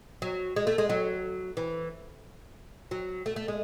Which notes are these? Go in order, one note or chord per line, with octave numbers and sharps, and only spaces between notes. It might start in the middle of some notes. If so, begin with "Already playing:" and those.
F#3
G#3
A3
G#3
F#3
E3
F#3
A3
A3
G#3